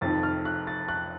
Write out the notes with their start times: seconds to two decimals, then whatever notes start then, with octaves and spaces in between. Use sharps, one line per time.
0.01 F1 F2 D#3 A6
0.23 F6
0.45 F#6
0.67 A6
0.88 F#6